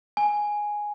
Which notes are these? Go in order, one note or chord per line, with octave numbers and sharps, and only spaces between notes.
G#5